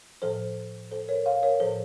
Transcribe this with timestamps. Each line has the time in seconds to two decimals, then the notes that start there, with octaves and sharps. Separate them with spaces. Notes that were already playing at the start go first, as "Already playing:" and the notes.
0.22 A2 F3 A4 C5
0.91 A4 C5
1.08 A#4 C#5
1.26 C#5 F5
1.43 A#4 C#5
1.60 A2 F3 A4 C5